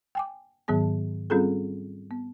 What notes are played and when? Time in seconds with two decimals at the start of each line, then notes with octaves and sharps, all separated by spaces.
0.15 G5 G#5 D6
0.68 G#2 D#3 F#3 B3 G#4 A5
1.30 G3 C4 C#4 F4 G#4 A4
2.11 B3